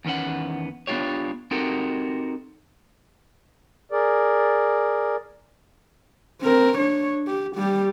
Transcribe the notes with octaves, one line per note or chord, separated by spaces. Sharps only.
E2 D#3 B3 C#4 F#5
B3 D4 D#4 F4 G4 C#5
C4 D#4 F#4 G4 A4 A#4
G#4 A#4 D5
C4 A#4
D4 C#5
G4
G3 G4